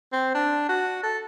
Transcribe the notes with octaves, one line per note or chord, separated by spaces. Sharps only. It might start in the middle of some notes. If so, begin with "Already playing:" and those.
C4
D4
F#4
A4